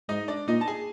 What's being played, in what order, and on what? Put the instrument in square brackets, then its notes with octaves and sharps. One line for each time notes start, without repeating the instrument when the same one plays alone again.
[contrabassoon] G#2 [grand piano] D#4 D#5
[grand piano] D4 D5
[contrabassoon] A#2 [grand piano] D#4 D#5
[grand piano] A5
G#4 G#5